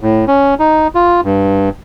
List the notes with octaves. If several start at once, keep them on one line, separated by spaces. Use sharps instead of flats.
A2
C#4
D#4
F4
G2